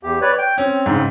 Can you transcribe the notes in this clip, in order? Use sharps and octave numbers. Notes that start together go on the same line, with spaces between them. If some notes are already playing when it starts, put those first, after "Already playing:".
E2 G4
B4 C#5 D5
G5
C4 C#4
G#2 C#3